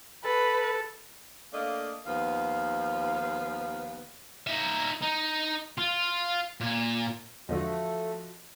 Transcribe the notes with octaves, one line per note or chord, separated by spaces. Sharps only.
A4 B4
A3 A#3 D4 D#5 F5
D#2 F3 B3 F5
D#4 E5
D#4
F4
A#2
E2 G#2 D3 F3 A3 F#4 D#5